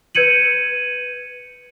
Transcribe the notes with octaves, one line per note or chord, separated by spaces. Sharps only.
B4 G6 G#6 C#7 D#7 F#7